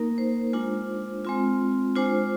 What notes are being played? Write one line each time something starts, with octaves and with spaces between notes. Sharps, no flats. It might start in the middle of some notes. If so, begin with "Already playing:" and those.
Already playing: A#3 D#4 A#4
C5
G#3 D4 F4
G#3 C4 F4
G#3 D4 F4 C5